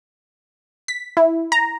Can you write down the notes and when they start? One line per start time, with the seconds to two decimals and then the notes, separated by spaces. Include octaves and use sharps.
0.88 B6
1.17 E4
1.52 A#5